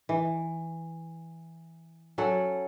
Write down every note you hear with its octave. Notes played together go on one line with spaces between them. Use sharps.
E3
F#3 C#4 A4 F#5